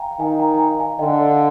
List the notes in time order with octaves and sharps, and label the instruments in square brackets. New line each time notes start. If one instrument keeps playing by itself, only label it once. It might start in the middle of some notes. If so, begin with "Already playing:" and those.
Already playing: [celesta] F5 G5 G#5 A#5
G5
[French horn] D#3 [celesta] F5 G#5
[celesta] G5 A#5
A#5
F5 G#5
F5 G#5
[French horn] D3 [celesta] D#5 G5
[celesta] D5 F5